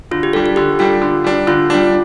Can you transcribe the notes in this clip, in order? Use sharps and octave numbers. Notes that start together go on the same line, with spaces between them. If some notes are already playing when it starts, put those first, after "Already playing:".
D3 F4
G4
G3 D4 A4
A4
D3 G4
G3 D4 F4
D3
G3 D4
D3 F4
G3 D4